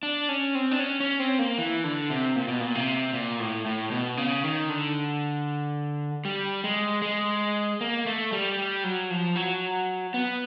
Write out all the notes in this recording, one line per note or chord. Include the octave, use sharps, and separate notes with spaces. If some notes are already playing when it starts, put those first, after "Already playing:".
D4
C#4
C4
D4
C#4
C#4
C4
A#3
E3
D3
C3
A#2
B2
A#2
C3
A#2
A2
A2
B2
C#3
D#3
D3
G3
G#3
G#3
A#3
A3
G3
G3
F#3
F3
F#3
B3